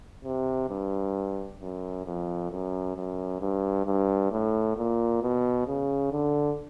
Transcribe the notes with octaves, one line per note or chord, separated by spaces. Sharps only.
C3
G2
F#2
F2
F#2
F#2
G2
G2
A2
A#2
B2
C#3
D3